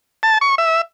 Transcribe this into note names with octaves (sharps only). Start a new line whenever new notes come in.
A5
C#6
E5